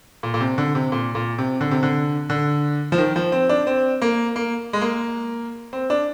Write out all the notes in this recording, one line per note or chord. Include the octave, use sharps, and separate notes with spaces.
A#2
A#2
C3
D3
C3
A#2
A#2
C3
D3
C3
D3
D3
F3
D#3
F3
C4
D4
C4
A#3
A#3
G#3
A#3
C4
D4